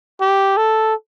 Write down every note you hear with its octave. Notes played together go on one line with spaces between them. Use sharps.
G4
A4